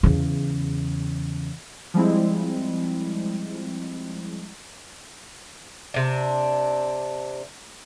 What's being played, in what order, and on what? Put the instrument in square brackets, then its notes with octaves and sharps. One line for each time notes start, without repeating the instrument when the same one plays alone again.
[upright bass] E2 C#3
[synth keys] F3 G3 G#3 C4 E4
[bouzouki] C3 D4